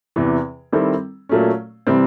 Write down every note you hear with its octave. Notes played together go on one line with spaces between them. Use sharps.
E2 C3 E3
D#3 G3 C4 E4 A4
A#2 F#3 A3 C#4
C3 E3 G3 C4